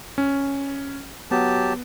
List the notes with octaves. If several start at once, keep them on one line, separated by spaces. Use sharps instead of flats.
C#4
F#3 B3 G4 A5